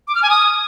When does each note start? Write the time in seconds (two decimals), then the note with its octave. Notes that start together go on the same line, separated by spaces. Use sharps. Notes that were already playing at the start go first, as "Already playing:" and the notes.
0.08 D6
0.15 F6
0.23 G#5
0.30 D#6